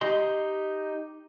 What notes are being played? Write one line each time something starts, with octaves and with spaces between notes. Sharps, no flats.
D#4 G4 D#5 C6